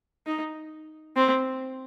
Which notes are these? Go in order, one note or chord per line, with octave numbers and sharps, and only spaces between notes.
D#4
C4